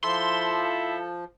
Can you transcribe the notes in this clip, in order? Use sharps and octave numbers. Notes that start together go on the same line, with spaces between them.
F3 E4 A4 C6